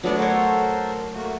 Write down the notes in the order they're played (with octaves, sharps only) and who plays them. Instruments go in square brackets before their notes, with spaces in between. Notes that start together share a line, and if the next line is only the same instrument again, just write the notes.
[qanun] F#3 A3 D5 [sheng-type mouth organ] B3 D4
[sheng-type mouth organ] A4 A#4 C5 [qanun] C#5 F#5
[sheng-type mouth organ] A3 A#3 F#4